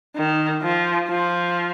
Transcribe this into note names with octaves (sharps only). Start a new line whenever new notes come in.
D#3
F3
F3